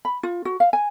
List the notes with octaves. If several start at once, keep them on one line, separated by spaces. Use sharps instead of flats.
B5
F4
F#4
F5
G#5